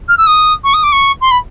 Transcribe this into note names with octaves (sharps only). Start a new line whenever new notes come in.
F6
E6
D#6
C#6
D#6
D6
C#6
C6
B5